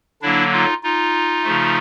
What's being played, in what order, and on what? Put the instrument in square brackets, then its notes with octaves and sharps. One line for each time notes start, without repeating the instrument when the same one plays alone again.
[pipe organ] D3 F#3 A#3 D4 E4
D#4 F4
D#4 F4
C#3 F3 A3